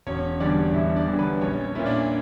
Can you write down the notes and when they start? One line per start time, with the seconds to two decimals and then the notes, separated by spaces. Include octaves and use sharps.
0.07 E1 C#4 C#5
0.40 E2 D3 G3 D4 D5
0.74 E1 E4 E5
0.96 D4 D5
1.07 E2 D3 G3
1.19 B3 B4
1.41 A#1 C#4 C#5
1.64 C#4 C#5
1.75 A#2 A#3 C#4 E4
1.86 D4 D5